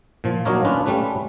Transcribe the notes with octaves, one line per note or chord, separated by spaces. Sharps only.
A#2 F3
F#3 A#3 D4 D#4 A#4 C#5
C#4 D4 F4 B4
G3 A3 C#4 B4